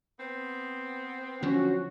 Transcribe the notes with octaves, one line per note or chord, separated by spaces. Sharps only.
B3 C4
D3 F3 F#3 C#4 F#4